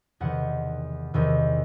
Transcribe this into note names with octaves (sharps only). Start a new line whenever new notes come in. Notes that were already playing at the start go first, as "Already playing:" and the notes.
E2 C3 D#3 F#5
E2 C3 D#3